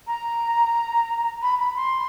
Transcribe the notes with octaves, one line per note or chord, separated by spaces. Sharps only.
A#5
B5
B5
C6